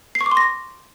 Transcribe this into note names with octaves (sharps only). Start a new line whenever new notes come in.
C7
C#6
D6
C6
A#6